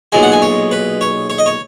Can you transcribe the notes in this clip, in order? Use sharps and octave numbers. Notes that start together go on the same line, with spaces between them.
B1 A#2 G#3 G#5
F#5
G#5
C#5
B4
C#5
C#5
D#5
C#5